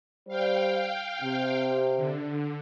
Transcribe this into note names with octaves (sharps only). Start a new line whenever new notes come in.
G3 C5 F5 G5
C3
D3